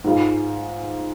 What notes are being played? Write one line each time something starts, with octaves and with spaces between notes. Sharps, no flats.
G#2 G#3 F4